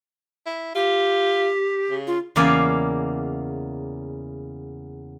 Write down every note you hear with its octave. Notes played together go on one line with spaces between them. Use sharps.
E4
F4 G4
C#3
F4
E2 C#3 A#3 D5 F5 G#5